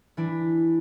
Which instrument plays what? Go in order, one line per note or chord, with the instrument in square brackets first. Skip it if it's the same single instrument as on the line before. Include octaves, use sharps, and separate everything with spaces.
[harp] E3 D4 E4